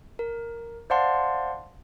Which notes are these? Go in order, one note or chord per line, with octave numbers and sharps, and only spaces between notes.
A#4
C5 D5 F5 F#5 A5 C6